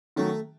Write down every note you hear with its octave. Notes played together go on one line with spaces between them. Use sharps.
D#3 F#3 A3 C#4 F#4